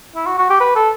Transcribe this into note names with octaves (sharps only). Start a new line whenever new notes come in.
E4
F#4
F#4
G4
B4
A4